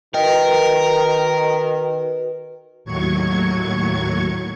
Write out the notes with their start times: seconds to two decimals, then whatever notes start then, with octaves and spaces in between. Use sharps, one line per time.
0.14 D#3 F#4 A#4 B4 D#5 G5
2.85 D#2 A2 F#3 C#6 G#6